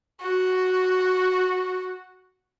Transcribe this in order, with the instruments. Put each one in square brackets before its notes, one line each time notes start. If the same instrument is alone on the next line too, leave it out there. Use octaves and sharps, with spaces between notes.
[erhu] F#4